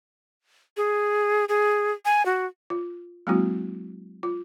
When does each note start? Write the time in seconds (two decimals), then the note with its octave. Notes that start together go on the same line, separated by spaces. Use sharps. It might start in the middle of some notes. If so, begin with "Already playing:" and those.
0.77 G#4
1.49 G#4
2.05 G#5
2.26 F#4
2.70 F4
3.27 F#3 G#3 A#3 C4 E4 F#4
4.23 F4